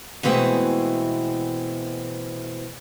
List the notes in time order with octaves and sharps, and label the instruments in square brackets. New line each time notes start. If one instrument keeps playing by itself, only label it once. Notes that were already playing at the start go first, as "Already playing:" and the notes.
[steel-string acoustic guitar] B2 E3 G#3 A3 C4